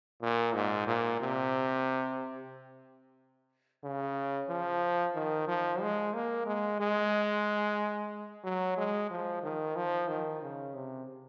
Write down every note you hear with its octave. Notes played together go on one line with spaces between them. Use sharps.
A#2
G#2
A#2
C3
C#3
F3
D#3
F3
G#3
A#3
G#3
G#3
F#3
G#3
F3
D#3
F3
D#3
C#3
C3